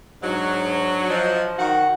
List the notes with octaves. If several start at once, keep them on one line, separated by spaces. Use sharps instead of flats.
G#2 F#3 D4
F3 D#5
D#3 F#4 F#5